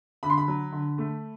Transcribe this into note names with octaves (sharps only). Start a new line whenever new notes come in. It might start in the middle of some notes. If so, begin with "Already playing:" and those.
D3 B5
C6
B5
F#3
D3
A3